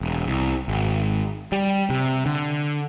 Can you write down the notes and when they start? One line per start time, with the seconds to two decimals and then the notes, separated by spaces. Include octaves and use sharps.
0.01 E1
0.27 C2
0.68 G#1
1.52 G3
1.90 C3
2.26 D3